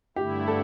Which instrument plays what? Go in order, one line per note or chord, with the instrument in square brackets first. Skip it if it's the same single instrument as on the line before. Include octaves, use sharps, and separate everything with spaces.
[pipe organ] G2 D3 A3 E4 [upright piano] G4
[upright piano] A4